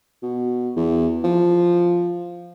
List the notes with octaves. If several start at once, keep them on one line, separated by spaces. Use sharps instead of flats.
B2
E2
F3